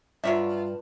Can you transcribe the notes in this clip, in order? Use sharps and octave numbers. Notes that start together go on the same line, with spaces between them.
G2 F#3 F4 C#5 E5